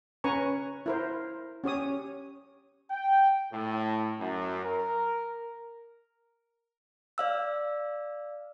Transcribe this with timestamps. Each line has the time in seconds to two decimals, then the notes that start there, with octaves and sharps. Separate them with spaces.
0.24 C#4 B4 G#5 A#5 C#6
0.86 E4 A#4 C5
1.64 C#4 G4 C#5 D#6
2.91 G5
3.53 A2
4.19 F#2
4.64 A#4
7.18 D5 F5 E6